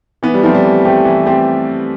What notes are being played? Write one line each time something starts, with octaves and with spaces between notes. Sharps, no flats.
E3 B3
G3
F3 A3 C4 G4
G3
E3
A3 C4 G4
E3
A3 C4 G4